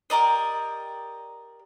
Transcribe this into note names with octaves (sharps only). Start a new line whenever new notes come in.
G4 A#4 D5 D#5